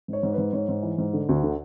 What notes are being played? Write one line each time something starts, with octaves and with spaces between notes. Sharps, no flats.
G#2 C#5
G#2
G#2 B4
G#2 C#5
G#2
E3
G#2
D3
D2
D3